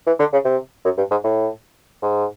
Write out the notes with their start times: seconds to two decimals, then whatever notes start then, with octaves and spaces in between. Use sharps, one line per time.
0.07 E3
0.19 D3
0.33 C#3
0.45 C3
0.84 F#2
0.97 G2
1.11 G#2
1.24 A2
2.02 G#2